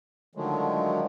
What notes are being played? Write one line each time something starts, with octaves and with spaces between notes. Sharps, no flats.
D3 D#3 F3 F#3 G#3 A3